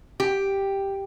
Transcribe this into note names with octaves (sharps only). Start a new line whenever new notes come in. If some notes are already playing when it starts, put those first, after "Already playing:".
G4